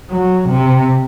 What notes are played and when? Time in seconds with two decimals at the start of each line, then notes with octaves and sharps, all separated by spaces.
0.10 F#3
0.49 C3